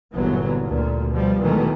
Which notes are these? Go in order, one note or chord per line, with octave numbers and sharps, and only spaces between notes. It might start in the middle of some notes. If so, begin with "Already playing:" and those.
G1 A#2 D3 E3 F#3 B3
D2 A#2
B2 F3 G3
B2 D#3 E3 F#3 G#3 A3